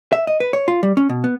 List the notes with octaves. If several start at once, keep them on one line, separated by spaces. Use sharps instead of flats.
E5
D#5
B4
C#5
F4
G3
C#4
B2
B3